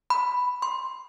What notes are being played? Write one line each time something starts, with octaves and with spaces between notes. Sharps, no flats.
B5
C6